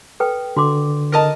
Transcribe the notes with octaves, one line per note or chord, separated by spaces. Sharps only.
A4 B4 G5
D3 F#4 C6 D6
A#4 D#5 A5